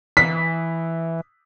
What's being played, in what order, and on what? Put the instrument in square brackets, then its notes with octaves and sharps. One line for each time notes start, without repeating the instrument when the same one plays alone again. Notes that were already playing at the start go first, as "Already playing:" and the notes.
[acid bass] E3 [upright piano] B6